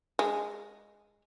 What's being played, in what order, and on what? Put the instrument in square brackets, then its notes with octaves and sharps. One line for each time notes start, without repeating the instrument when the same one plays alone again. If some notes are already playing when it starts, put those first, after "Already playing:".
[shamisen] G#3